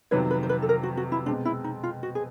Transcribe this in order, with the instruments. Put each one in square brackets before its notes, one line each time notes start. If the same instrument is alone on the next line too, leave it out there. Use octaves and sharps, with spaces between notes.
[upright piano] F2 C3 D#3 F#3 B3 [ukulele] B4 C#5
[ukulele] B4
C5
B4
A4
A#4
F#4
F#4
E4
[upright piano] B2 G#3 C4 [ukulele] D4
[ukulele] E4
D#4
F4
F#4
G#4